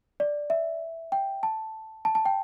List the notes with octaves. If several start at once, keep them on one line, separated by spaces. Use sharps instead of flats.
D5
E5
G5
A5
A5
A5
G5